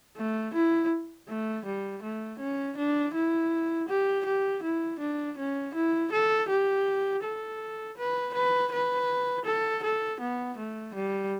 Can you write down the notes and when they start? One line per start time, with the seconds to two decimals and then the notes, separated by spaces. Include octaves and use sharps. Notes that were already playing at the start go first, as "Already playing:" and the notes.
0.17 A3
0.54 E4
1.28 A3
1.65 G3
2.03 A3
2.40 C#4
2.77 D4
3.15 E4
3.89 G4
4.26 G4
4.63 E4
5.00 D4
5.38 C#4
5.75 E4
6.12 A4
6.49 G4
7.24 A4
7.97 B4
8.34 B4
8.72 B4
9.46 A4
9.83 A4
10.20 B3
10.58 A3
10.95 G3